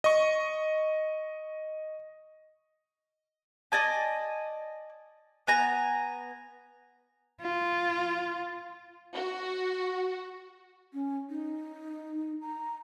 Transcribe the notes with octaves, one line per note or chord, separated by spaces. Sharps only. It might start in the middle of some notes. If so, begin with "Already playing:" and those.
D#5 C#6
D5 D#5 G#5 A5
B3 G#5 A#5
F4
F#4
C#4
D#4
A#5